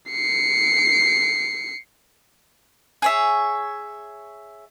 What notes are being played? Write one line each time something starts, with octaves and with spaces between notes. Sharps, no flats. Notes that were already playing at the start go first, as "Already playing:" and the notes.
C7 C#7
G#4 C#5 E5